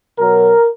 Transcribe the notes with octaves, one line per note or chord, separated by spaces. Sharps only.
B2 F#3 A#4